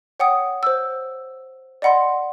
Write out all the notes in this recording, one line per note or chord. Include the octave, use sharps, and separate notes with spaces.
C#5 F#5 G5 D#6
C5 E6
D5 D#5 F#5 B5 C6